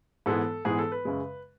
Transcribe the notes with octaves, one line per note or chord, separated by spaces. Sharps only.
G#2 E3 G#3 B3 E4 A4
G#2 E3 G#3 B3 E4 G#4
A4
B4
F#2 C#3 G#3